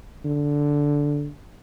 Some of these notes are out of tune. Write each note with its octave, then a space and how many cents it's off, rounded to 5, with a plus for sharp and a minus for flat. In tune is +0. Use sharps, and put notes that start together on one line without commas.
D3 -10